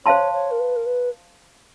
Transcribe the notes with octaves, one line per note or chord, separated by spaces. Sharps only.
C5 C#5 F5 A5 C6
C#5
A#4
B4
A#4
B4